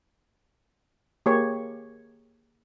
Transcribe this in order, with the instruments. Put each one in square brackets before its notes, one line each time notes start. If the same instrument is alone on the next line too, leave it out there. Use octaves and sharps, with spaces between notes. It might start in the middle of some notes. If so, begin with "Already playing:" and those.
[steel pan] A#3 G4 G#4 C#5